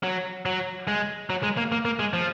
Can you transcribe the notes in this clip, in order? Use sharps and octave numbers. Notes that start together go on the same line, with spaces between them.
F#3
F#3
G#3
F#3
G#3
A#3
A#3
A#3
G#3
F3